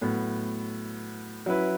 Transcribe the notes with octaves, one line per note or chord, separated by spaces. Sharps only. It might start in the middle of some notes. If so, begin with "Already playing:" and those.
A2 F#3 B3
F#3 C#4 E4 B4